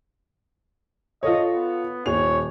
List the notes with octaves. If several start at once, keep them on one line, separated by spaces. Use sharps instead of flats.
F4 A4 C#5 D#5
B3
D#1 C#5 F7